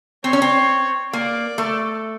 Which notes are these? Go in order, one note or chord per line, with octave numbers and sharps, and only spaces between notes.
C4 C#5
C#4
C4
A#3 D5
A3